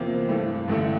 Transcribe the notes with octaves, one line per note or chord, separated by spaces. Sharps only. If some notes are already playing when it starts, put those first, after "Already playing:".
Already playing: E2 C3 F3 A#3
G2 E3 A3
A1 G2 D3 A3 E4